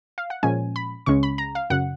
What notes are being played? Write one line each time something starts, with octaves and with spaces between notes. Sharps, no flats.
F5
F#5
A#2 F3 G#3 C#4 G#5
B5
C#2 C#3 G#3 C#4 C#6
B5
A#5
F5
F#2 C#3 F#3 F#5